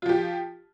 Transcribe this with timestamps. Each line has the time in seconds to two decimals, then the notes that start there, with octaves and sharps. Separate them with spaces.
0.02 F4
0.06 F3
0.09 G4